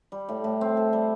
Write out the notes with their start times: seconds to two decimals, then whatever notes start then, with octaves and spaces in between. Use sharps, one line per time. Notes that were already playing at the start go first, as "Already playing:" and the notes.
0.12 G3
0.29 A2
0.44 A2
0.61 C4
0.77 A4
0.93 G3